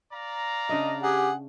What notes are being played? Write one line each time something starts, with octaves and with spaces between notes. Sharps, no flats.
D5 F5 A#5
C#3 D4 D#5 E5
G4 G#4 F#5